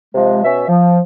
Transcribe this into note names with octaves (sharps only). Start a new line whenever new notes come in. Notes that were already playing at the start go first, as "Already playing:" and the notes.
C3 F3 G#3
B2 C#4 E5
F3